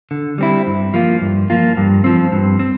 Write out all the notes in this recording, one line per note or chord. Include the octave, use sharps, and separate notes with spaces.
D3
G3 C4 E4
G2
F3 A#3 F4
G2
F3 A#3 F4
G2
F3 C4
G2
C4